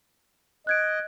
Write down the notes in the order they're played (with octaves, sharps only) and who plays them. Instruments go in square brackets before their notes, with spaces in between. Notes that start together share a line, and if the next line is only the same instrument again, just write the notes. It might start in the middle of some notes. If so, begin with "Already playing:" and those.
[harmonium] D#5 [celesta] F#6 G#6 D7